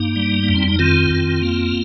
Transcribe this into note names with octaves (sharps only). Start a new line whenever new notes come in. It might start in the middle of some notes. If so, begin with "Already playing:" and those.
Already playing: G2 A#3 D#4
G3
A#3
F2
C4
D#4
D#3 C4 F4
F2
A#3